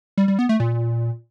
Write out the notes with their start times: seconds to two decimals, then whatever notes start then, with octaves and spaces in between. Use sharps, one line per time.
0.18 G3
0.28 G3
0.39 B3
0.49 A3
0.60 A#2